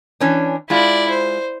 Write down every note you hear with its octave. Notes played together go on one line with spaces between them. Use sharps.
E3 C#4 D4
G#3 E4 F4 D5
C5